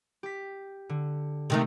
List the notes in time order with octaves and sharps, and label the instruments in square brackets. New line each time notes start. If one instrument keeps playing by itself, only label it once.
[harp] G4 B6
D3
[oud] C3 D#3 A3